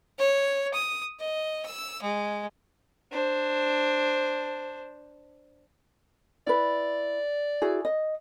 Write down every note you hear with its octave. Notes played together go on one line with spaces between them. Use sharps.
C#5
D#6
D#5
E6
G#3
D4 C5
E4 B4 D5
E4 F#4 G#4
D#5